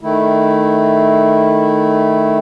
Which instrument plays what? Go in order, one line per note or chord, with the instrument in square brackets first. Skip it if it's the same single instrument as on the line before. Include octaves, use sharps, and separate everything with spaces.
[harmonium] D#3 A3 E4